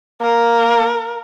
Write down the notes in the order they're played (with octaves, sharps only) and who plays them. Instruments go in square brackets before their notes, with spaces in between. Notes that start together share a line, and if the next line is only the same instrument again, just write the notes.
[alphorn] A#3 [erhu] A#4